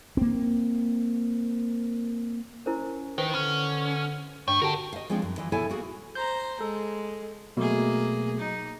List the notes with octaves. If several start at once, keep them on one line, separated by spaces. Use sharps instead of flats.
A#3 C4
C#4 E4 A#4 C5
D#3 B4 C5
D3 C#4
G2 A3 C#5 G5 C#6
D3 F#4 G4 A#4 G5 A5
D#5 F5
F3 G#3 C4 D4 D#4
F#2
E3 F3 D#5
D#2 B2 E4 A4 C#5 G#5
A#3 F#4 G#4
C5 A#5 G6
G#3 A4
B2 F#3 A3 A#3 G#4
D#4